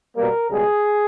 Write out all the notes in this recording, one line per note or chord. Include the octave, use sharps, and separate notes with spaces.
B2 G3 A#3 A#4
C#2 B2 G3 G#4